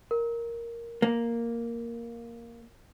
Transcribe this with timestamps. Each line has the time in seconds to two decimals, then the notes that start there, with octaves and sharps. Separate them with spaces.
0.11 A#4
1.02 A#3